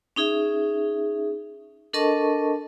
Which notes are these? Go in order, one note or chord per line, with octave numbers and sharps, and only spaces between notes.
C#4 D#4 G#4 E5
D4 A4 A#4 D#5 A5 C#6